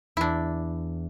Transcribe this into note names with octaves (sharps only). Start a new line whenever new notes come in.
E2 D4 E4